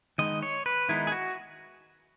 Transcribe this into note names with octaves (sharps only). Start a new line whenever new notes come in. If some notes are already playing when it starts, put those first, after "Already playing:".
D#3 G#3 B3 D#4 D#5
C#5
B4
D#3 G#3 B3 D#4 E4
G#4
F#4